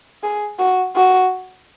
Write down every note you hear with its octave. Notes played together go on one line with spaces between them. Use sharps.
G#4
F#4
F#4